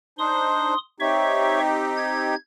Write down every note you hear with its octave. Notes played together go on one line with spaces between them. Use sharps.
D4 D#4 C5 C6 D#6
C4 D#4 G4 C#5 E5 C#6
G#6